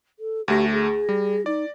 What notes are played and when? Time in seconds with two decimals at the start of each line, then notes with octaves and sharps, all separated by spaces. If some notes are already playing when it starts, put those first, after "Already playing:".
0.19 A4
0.48 D2 A3 G4 A#6
0.72 G#4
1.09 G3
1.46 D#4 D5